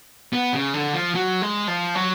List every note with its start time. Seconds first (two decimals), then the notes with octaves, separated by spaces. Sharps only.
0.33 B3
0.53 C#3
0.74 D3
0.93 F3
1.15 F#3
1.42 G#3
1.68 F3
1.95 F#3